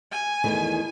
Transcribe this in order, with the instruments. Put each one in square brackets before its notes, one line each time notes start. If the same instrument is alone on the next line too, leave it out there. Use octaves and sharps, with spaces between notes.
[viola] G#5
[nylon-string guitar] E2 D#3 A3